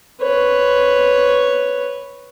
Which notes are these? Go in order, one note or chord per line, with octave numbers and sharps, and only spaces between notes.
B4 C#5